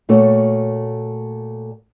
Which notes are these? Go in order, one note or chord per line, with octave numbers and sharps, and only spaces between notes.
A#2 A3 F#4 A4 C#5